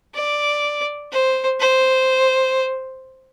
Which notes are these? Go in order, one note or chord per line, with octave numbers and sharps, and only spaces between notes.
D5
C5
C5